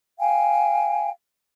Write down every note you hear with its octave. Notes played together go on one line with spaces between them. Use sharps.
F5 G5 G#5